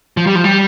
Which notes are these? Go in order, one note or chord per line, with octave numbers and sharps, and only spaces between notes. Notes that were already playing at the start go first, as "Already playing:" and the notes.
F3
G3
F3
G3